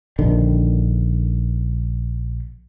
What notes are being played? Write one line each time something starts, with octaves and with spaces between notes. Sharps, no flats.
A#1 D3 D#3